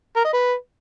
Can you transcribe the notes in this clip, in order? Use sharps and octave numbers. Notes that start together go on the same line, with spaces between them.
A#4
D#5
B4